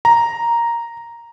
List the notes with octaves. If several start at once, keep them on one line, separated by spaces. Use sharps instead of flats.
A#5